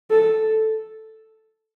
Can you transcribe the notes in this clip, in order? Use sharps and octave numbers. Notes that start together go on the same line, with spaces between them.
A4